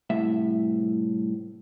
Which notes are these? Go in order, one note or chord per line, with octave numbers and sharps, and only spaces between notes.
C2 A2 E5